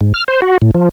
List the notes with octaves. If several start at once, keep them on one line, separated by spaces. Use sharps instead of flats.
G#2
F6
C5
F#4
A2
F3